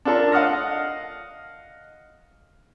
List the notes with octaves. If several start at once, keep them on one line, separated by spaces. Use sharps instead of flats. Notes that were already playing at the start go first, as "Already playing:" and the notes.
D4 F4 A4 A#4 A5
D#5 F5 F#5 D#6 F6 A#6